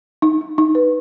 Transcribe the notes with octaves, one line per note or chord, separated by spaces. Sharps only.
D#4
D#4
D#4
B4